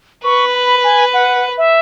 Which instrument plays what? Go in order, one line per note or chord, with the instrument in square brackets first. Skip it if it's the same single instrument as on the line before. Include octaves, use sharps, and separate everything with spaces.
[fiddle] B4 [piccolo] C#6
[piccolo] B5
G#5
F#5
E5